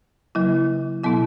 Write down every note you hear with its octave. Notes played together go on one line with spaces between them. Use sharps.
C#3 F#3 A#3 E4
B2 F#3 B3 E4